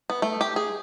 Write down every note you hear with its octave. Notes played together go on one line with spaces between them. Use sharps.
B3
A3
G4
G#4